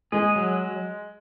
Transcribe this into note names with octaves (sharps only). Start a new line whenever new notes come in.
G#3 G#4
F#3